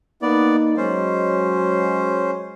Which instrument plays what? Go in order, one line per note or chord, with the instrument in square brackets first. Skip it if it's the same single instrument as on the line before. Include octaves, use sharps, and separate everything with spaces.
[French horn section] A#3 D#4 [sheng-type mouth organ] B3 D5
[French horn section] F#3 G#3 [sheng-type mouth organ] C#4 C5